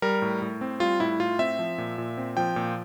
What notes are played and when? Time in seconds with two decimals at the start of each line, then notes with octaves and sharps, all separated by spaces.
0.02 G3 A#4
0.22 A2
0.42 A2
0.61 C4
0.80 G3 F4
1.00 A2 E4
1.20 A2 F4
1.39 C4 E5
1.59 F3
1.78 A#2
1.98 A#2
2.18 C4
2.37 F3 G5
2.56 A#2